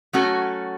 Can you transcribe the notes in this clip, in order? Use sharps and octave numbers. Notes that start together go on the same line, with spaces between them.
F#3 A3 C#4 F#4 A4